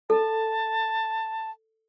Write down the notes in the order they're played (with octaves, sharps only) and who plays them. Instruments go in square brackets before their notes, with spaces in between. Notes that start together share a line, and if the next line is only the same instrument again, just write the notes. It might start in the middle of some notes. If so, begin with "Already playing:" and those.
[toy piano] A4 [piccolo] A5